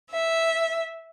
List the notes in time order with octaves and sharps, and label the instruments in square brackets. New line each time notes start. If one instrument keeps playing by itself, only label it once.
[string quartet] E5